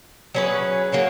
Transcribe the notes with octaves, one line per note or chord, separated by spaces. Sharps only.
F#3 C#4 G#4 B4
C#3 F#3 A#3